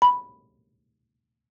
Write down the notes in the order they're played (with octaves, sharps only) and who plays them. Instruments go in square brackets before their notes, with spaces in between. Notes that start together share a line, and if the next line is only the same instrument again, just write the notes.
[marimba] B5